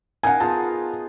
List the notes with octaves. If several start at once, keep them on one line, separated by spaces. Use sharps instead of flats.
D#4 A#4 F5 F#5 G#5
B3 F4 G#4 A5